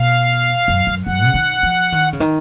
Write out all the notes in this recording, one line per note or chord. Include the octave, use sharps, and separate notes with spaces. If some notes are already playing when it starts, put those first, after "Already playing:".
Already playing: B2 F5
F#2
F#2
F#2 F#5
C#3
D#3
F3
D#3
C#3
D#3